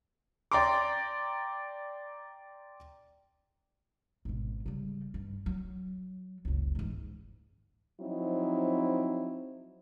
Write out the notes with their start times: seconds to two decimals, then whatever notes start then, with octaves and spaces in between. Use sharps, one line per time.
0.52 D5 G5 A#5 C6 D6
4.25 G#1 B2
4.66 C#3 G3
5.14 G2
5.46 F#3
6.45 F#1 C#2
6.75 E2 G#2
8.01 F3 F#3 C4 D#4 E4